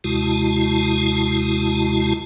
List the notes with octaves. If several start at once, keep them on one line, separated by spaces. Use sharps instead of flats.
D#2 C3 G#3 E4 F#4 A5